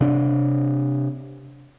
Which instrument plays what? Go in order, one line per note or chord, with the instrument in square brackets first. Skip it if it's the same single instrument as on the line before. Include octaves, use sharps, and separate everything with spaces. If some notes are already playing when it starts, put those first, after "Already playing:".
[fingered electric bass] C3 D4